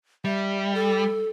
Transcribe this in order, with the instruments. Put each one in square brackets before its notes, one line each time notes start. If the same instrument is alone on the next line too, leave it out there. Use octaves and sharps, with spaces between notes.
[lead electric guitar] G3 [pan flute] E5
[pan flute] A4